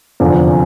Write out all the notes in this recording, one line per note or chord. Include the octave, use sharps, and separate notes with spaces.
F1 E2 D3 F3 C4